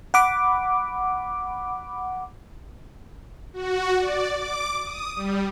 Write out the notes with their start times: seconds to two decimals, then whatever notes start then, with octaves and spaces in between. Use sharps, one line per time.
0.14 F#5 B5 D6
3.53 F#4
3.98 D5
4.29 D6
4.84 D#6
5.16 G3